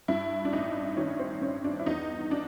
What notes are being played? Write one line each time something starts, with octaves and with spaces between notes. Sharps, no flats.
G2 E4
D4
A1 D#4
D#3 C#4
C4
G2 C#4
D4
E4
E2 D#4
D4